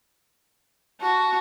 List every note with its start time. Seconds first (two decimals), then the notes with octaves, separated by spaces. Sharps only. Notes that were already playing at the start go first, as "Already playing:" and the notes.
1.01 F#4 A5